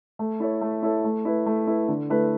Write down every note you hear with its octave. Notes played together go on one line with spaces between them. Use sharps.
A3
E4 A4 C#5
A3
E4 A4 C#5
A3
E4 B4
A3
E4 B4
D3
A3 E4 B4